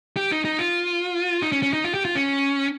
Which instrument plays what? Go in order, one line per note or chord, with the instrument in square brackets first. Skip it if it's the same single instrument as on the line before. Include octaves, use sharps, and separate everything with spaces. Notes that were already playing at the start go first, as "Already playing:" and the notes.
[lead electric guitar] G4
D#4
D#4
F4
D#4
C#4
C#4
D#4
F4
G4
F4
C#4